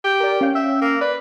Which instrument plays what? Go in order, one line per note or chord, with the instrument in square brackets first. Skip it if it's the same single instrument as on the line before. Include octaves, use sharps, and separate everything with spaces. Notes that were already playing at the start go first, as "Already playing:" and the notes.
[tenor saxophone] G4
[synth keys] A#4 D5
C#4 F5 G5
[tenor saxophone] E5
A#3
[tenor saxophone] B4 [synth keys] D5